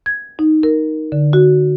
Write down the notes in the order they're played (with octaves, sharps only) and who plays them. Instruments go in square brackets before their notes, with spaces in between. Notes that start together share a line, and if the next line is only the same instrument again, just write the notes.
[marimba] G#6
D#4
A#4
D3
F#4